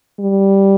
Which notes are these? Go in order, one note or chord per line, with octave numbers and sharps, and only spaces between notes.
G3